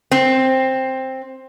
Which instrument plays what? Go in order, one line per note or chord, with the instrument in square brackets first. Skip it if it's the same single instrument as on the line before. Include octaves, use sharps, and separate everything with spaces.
[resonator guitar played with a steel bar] C4